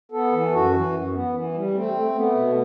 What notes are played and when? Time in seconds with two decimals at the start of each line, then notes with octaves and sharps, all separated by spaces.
0.12 B3 A4
0.32 E3
0.52 F#2 F#4
0.73 E3
0.93 F#2
1.13 B3
1.34 E3
1.54 G3
1.74 A3 C4
1.94 A3
2.15 A3 B3
2.35 B2